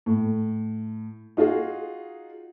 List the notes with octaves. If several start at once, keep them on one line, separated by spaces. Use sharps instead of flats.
A2
D#4 F4 F#4 G#4